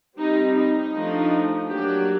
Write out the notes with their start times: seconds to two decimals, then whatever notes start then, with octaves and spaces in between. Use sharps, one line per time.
0.18 G3 C4 D#4
0.57 D#4
0.95 F3 A3 D4
1.70 F#3 A#3 D4 G4